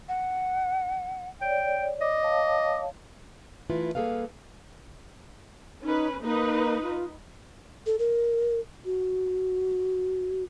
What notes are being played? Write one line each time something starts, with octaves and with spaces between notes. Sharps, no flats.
F#5
C#5 D5 G5
D#5 D6
C#5 F5 A5
E3 A3 E4 F4 B4
G3 A#3 G#4 A4 B4 F5
C#4 D#4 B4
A#3 D#4 B4 D#5
F4
A4
A#4
F#4